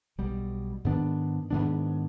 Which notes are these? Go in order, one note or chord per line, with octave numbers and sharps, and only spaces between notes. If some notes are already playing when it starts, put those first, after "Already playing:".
B1 B2 G3
G#2 D#3 B3 D4
G#2 D#3 B3 D4